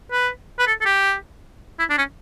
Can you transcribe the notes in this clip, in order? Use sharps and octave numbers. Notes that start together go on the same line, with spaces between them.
B4
B4
A4
A4
G4
E4
D4
C#4